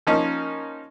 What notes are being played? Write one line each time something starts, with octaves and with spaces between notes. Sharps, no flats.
F3 A#3 C#4 D#4